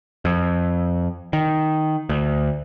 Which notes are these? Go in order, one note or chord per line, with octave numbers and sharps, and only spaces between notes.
F2
D#3
D2